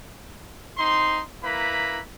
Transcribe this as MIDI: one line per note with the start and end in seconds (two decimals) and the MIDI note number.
0.78 1.22 60
0.78 1.22 63
0.78 1.22 84
1.44 2.01 58
1.44 2.01 64
1.44 2.01 71
1.44 2.01 82
1.44 2.01 83